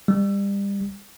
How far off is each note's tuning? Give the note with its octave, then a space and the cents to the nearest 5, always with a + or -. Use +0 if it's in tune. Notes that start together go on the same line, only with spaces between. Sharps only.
G3 +30